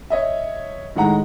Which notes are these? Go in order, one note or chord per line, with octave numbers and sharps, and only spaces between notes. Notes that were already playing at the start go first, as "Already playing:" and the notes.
C#5 D#5 E5
A2 D#3 G#3 F#5 A#5